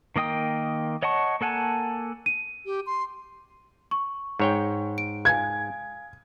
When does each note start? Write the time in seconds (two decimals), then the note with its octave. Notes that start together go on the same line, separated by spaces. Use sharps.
0.16 D#3 A#3 D#5 G5 D#6
1.03 C#5 D#5 F#5 A5 C#6
1.41 A#3 A4 F#5 G#5 A5
2.26 D#7
2.66 G4
2.86 C6
3.91 C#6
4.39 G#2 C#5 G5
4.98 D7
5.25 F5 G#5 G#6